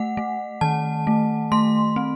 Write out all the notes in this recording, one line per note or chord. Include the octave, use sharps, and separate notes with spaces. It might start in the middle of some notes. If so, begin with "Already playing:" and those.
Already playing: A3 F#5
A3
D#3 A5
A3
A3 C6
C4